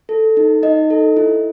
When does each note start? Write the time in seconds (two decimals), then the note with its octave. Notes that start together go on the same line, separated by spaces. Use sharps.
0.09 A4
0.37 D#4
0.63 D#4 D#5
0.90 A4
1.17 E4